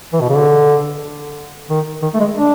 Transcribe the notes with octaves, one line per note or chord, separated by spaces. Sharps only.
E3
B2
C#3
D3
D#3
D#3
A3
G#3
D4